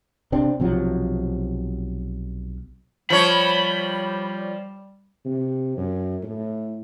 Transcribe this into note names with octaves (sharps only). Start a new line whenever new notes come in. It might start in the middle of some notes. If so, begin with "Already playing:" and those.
C3 C4 D4
B1 C3 F3 F#3
F3 G3 C#5 B5
C3
F#2
A2